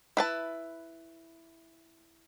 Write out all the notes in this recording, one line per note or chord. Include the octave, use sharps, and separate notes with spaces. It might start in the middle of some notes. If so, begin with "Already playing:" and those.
E4 B4 A5